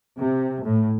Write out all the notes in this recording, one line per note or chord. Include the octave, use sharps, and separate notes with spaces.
C3
A2